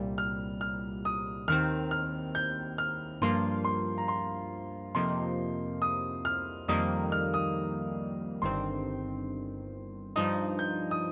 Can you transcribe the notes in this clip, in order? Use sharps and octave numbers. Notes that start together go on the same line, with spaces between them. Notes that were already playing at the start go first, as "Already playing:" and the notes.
Already playing: C2 A#2 G3
F6
F6
D#6
D#2 D#3 C4 F6
F6
G6
F6
G2 F3 A#3 F4 C6
C6
A#5
C6
F2 C3 F3 A#3 D#4 C6
D#6
F6
F2 D#3 G3 A#3 D#4 D#6
F6
D#6
G1 G2 D#3 C4 C6
G2 F3 D#4 D#6
G6
D#6